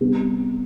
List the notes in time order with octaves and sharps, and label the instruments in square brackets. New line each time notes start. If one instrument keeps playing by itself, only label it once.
[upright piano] C3 G3 B3